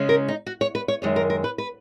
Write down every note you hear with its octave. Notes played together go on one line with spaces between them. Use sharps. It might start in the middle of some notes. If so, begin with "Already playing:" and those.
Already playing: C#3 G#3 C#4
A#4
D#4
F#4
C#5
B4
C#5
F#2 D#3 G#3 C#5
A#4
A#4
B4
B4